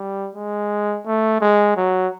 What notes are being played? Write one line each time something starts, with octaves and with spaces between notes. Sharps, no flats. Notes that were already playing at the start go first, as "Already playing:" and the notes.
Already playing: G3
G#3
A3
G#3
F#3